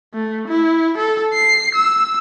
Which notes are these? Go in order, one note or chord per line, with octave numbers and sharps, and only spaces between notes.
A3
E4
A4
C7
E6